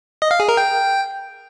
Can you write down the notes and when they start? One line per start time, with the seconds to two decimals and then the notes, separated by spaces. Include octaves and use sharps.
0.22 D#5
0.31 F5
0.40 G#4
0.49 A#4
0.57 G5